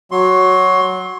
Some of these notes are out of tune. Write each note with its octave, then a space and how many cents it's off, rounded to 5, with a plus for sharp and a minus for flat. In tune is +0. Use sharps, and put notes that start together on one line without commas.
F#3 +5 F#4 +0 C6 +20